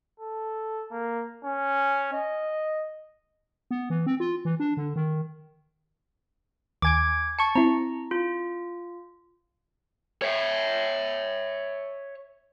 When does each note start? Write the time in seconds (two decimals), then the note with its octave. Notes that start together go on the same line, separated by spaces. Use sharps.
0.20 A4
0.91 A#3
1.45 C#4
2.13 D#5
3.71 B3
3.90 E3
4.06 C4
4.20 F4
4.45 E3
4.60 D4
4.77 D3
4.96 D#3
6.82 D#2 G#5 D6 G#6 D7
7.39 A5 C#6 C#7
7.55 C4 E4 A#5
8.11 F4
10.22 C#5 E5